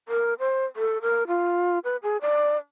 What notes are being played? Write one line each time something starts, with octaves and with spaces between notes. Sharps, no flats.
A#4
C5
A4
A#4
F4
B4
G#4
D5